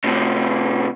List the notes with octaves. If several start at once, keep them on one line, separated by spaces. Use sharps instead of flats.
A2 C3